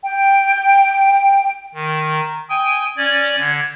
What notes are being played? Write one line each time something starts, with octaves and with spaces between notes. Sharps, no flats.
G5
D#3
A#5
G5 G#5 D#6
C#4 D5 G#6
D3